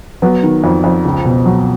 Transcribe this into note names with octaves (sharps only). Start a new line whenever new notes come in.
F#3 B3
D#3
F2
F2
C#2
B2
F#3